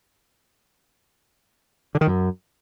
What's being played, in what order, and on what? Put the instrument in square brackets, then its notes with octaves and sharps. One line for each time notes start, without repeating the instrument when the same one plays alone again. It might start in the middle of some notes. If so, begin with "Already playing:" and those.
[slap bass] D3
D#3
F#2